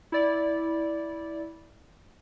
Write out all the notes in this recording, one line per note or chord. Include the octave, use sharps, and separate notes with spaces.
E4 D5